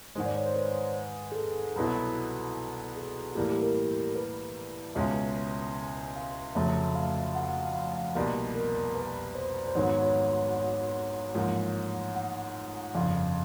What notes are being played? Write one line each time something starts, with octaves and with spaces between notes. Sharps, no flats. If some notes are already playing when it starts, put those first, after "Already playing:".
G#2 D#3 G#3 C5
D5
C#5
C5
B4
G#4
A4
C2 B2 F#3 B3 E4
G#4
A2 E3 G3 A#3 G4
G4
A#4
B4
C#2 B2 G#3 C#4 F4 E5
F5
F1 F2 C#3 F#3 A3 E5
F5
F#5
F5
F#5
F5
F5
F5
F#5
C2 B2 G3 A#3 D#5
A#4
B4
C5
C5
G#1 G#2 D#3 F#3 B3 C#5
C#5
C#5
C#5
A1 G#2 F3 A#3
F#5
G1 F2 C#3 F5